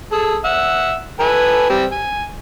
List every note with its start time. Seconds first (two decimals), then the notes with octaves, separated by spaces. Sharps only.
0.12 G#4 A4
0.44 E5 F#5
1.20 A4 B4 G#5
1.69 G3 C4 G4
1.92 G#5